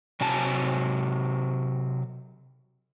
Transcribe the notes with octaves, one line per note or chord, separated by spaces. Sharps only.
C3 F#3 G#5 A5